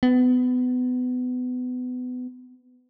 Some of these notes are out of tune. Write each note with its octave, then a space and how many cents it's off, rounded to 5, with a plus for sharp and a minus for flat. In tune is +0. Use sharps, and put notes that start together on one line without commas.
B3 +25